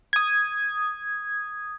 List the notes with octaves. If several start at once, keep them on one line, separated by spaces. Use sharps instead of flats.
D#6 G#6